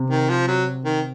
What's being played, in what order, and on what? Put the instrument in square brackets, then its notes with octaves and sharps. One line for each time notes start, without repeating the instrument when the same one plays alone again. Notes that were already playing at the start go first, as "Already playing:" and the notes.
Already playing: [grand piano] C3
[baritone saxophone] D#3
F3
F#3
D#3